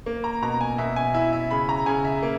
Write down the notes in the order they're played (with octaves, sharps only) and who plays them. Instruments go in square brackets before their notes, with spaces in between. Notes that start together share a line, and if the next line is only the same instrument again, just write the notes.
[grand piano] A#3
A#5
B2 A#5
G#5
B2 E5
G#5
E4 E5
E5
C#3 B5
A#5
C#3 G#5
E5
A#3